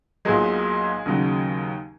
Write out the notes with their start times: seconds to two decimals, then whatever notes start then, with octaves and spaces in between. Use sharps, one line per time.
0.25 B1 A#2 F#3 G#3 G#4
1.06 D#2 C#3 F#3